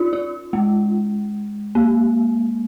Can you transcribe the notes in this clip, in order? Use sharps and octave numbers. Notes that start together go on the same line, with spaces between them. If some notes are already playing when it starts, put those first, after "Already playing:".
Already playing: C#4 D#4 F4
F4
G#3
A#3